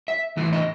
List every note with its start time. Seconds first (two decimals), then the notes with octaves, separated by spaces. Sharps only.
0.08 E5
0.37 A2 E3 E5
0.53 D#5